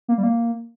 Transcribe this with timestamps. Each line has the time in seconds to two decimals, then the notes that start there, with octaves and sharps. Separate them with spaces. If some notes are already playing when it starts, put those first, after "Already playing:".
0.08 A#3
0.18 G3
0.23 A#3